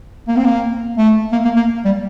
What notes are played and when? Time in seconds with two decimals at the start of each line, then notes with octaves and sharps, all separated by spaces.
0.28 A#3
0.36 C4
0.44 A#3
0.98 A3
1.32 A#3
1.45 A#3
1.56 A#3
1.85 G3